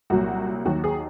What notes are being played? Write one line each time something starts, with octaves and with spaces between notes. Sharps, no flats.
C2 A#2 F#3 F#4
D#2 D#3 F#3 F#4
G#4